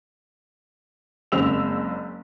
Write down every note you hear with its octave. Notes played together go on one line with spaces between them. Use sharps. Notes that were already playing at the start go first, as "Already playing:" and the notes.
F#1 C#3 G#3 C4 E6 F7